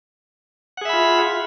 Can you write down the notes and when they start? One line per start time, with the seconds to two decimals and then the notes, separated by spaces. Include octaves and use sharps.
0.77 F#5
0.81 G#4
0.85 E5
0.89 B5
0.93 F4